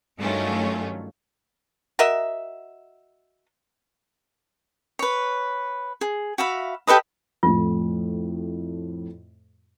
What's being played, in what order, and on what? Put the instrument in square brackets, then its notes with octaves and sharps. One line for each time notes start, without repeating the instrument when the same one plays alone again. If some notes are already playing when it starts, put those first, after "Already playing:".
[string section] G2 D#3 F#3 A3 C#4 F4
[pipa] F#4 A#4 D#5 E5
[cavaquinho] B4 C#5
G#4
F#4 E5 F5 B5
G4 A4 B4 D#5
[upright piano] F2 A2 [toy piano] F4